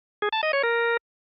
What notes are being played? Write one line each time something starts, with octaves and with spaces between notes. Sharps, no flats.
G#4
A5
D#5
C#5
A#4